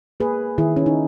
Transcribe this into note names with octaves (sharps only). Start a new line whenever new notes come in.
A#3 G#4 B4
D#3 E4 G#4
C#4
D#4